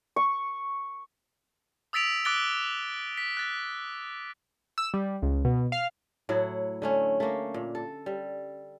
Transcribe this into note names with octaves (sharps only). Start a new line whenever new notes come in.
C#6
D#6 E6 A6 B6 D7 F7
D6 E6 F#6 A6 D7 G7
B6
F#6 A6
E6
G3
C#2
B2
F5
A2 F#3 E4 F#5
D3 A3 C#4
A3 A#3
A#2
A4
G3